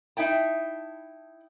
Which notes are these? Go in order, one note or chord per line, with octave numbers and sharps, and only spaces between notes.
D#4 E4 G5 A5